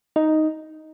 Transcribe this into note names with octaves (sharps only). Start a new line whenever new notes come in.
D#4